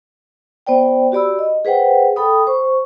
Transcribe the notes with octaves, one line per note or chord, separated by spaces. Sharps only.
B3 C5 D5 G5
F#4 G4 D5 B5 E6
D#5
G#4 B4 C5 F#5 G5
A4 G5 B5 D#6
C5 C#6